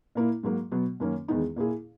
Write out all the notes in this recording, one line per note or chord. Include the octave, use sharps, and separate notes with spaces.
A#2 A#3 E4
G#2 F#3 A#3
B2 F#3 B3
F#2 D#3 A#3 C#4
E2 D#3 G#3 B3 D#4
A#2 A#3 E4 G#4